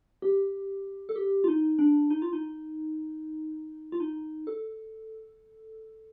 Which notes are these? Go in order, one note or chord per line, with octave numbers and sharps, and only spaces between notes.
G4
A4
G4
F4
D#4
D4
D#4
F4
D#4
F4
D#4
A4